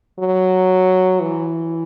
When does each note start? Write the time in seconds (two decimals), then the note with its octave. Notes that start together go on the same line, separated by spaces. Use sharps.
0.19 F#3
1.21 E3